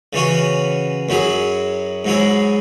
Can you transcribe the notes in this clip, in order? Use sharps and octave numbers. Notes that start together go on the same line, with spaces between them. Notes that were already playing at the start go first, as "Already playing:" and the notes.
C#3 E3 C#4 F#4
F#2 F#3 E4 G#4
G#2 F#3 E4 G#4